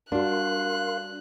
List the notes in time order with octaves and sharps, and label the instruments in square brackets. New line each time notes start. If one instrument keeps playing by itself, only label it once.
[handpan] G3 F#4 [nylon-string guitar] D4 [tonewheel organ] A#4 F5 C6 [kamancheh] F#6